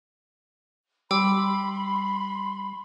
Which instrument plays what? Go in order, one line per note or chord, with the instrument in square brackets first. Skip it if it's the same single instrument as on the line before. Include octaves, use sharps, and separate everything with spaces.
[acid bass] G3 [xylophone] G5 D6 E6 [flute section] B5 C6